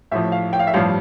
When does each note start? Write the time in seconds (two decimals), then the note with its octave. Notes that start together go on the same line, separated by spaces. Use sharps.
0.12 A1 A2 F3 E5
0.32 F5
0.53 G5
0.59 F5
0.67 E5
0.74 A1 G2 F3 F5